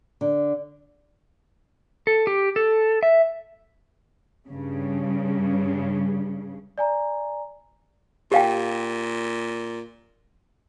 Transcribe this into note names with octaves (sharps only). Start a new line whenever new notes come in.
D3
A4
G4
A4
E5
G2 C#3
D5 G#5 A#5
A#2 G4 F5 G5